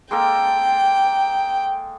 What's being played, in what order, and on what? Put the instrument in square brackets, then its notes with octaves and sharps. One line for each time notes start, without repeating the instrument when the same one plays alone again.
[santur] G#3 A#3 A4 [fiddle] G5